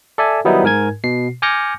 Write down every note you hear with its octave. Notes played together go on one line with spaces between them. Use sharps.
A4 D5 E5 G#5
D#3 F#3 G3 B3 D#4 E4
G#2 A#4 G#5 G#6
B2 C7
G#5 D6 F6 G6 A#6 C#7